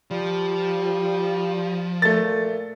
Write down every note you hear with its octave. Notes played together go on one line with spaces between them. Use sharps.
F3 G3
A#2 A3 A6